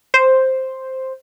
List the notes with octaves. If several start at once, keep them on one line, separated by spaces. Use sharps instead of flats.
C5